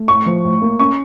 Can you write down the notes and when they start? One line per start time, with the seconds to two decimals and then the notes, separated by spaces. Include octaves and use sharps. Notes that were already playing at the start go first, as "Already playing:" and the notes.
Already playing: A3
0.08 A2 C#6
0.26 F3
0.44 A2
0.62 A#3
0.79 C#4 C#6